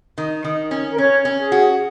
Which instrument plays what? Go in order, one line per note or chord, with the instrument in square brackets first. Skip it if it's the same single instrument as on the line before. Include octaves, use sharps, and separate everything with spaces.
[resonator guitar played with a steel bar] D#3
D#3
C#4
[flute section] A#4
[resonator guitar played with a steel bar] C#4 [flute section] C#5
[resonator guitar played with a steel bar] C#4
[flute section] G#4
[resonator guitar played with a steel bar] F#4